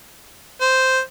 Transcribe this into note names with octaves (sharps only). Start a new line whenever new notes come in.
C5